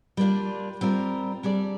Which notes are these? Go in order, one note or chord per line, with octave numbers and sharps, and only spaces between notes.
G3 A#3 D4 F4
G3 C4 F4 A#4
G3 D4 G#4 D5